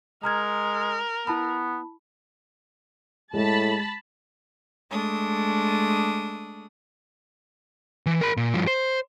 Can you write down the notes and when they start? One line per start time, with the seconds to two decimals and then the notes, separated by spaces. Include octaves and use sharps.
0.23 G#3 A#4 A#5 F6 G#6
1.27 B3 E4 A5 B5
3.34 A2 G#3 A5 B5
4.89 G#3 A3 D4 D#6
8.06 E3
8.21 A#4 B5
8.37 A#2
8.54 G2 F3
8.67 C5